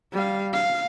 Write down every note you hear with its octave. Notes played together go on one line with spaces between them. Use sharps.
G3 F5
F5